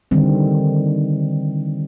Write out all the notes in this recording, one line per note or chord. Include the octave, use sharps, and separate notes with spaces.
D3 D#3 G3 C4